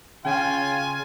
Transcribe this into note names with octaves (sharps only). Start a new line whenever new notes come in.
C#3 F4 G5 G#5